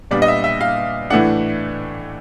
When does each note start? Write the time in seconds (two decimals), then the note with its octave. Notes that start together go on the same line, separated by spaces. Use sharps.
0.11 A#2 G3 B3 D4 D5
0.22 D#5
0.28 E5
0.44 E5
0.61 F5
1.10 A2 E3 A3 D4 F#5